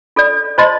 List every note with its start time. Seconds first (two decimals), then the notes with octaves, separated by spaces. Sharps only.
0.16 F4 A4 D5
0.58 F4 C5 D#5 A5 C6